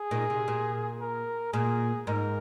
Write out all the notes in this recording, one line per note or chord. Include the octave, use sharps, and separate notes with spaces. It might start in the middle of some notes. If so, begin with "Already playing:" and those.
Already playing: G#4
A#2 D#3
C3
A#2
A#4
A#2 G#4
G#2 A#4